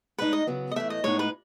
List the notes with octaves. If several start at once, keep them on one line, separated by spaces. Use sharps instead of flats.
A2 G#3 D#4 B4
D#5
C#3 F#3 B3
D#5
A2 E3 A3 E5
D#5
A2 G#3 B3 D#4 C#5
B4